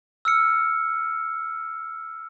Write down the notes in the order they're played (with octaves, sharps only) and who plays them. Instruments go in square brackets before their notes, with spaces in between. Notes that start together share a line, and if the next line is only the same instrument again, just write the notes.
[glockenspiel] E6 F6 C#7